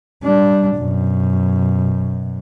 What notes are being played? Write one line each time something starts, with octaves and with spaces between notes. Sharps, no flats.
G3 D4
F#2 B2